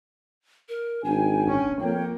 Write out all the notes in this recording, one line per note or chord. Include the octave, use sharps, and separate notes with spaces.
A#4
G#1 D4 G5 G#5
C#4
F2 A#3 C#5 G5